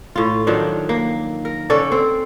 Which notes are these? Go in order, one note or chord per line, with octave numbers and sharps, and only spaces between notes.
A2 F4
D#3 F3 F#3 D4
A#3
A#4
D3 C#4 A4 D5
C4